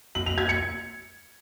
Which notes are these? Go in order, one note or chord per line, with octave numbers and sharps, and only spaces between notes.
F#7
F7
G#6
C#7